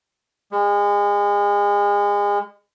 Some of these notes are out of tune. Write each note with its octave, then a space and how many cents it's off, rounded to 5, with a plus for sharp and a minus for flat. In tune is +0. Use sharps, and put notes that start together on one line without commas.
G#3 -30